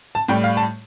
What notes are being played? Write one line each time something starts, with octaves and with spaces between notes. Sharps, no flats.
A5
A2 G3 G5
F5
A5